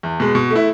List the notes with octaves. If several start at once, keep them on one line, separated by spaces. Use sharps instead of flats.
E2
B2 G#3
B2
A3
E4